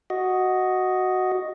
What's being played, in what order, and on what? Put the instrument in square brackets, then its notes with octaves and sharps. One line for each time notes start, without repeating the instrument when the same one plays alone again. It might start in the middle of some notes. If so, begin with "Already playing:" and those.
[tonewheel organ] F#4 D#5